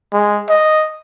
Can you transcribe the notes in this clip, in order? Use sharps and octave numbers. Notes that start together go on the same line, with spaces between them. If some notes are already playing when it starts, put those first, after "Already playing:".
G#3
D#5